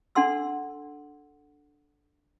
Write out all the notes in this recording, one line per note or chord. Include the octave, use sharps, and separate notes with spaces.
D4 A4 F#5 C6 E6